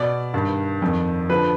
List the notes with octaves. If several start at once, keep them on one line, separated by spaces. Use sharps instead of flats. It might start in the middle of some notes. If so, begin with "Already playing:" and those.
Already playing: B2 D5
G2 D#3
F2 D#3
D3 F3 B4